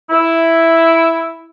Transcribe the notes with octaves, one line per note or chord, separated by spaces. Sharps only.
E4